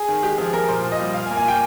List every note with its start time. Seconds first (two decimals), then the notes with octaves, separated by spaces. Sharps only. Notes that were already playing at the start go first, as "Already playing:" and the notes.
Already playing: G#4
0.08 D#3
0.23 G#3 G4
0.38 F3 G#4
0.53 F3 A#4
0.69 A#2 C5
0.84 A#2
0.92 D#5
1.00 G3
1.14 A#2 F5
1.26 G#5
1.30 A#3
1.37 G#5
1.45 A#2 G5